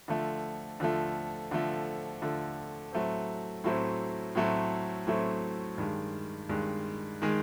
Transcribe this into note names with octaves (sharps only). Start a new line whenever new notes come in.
D3 F3 A3
D3 F3 A3
D3 F3 A3
D3 F3 A3
A2 F#3 A3 C4
A2 F#3 A3 C4
A2 F#3 A3 C4
A2 F#3 A3 C4
G2 D#3 G#3
G2 D#3 G#3
D#3 G#3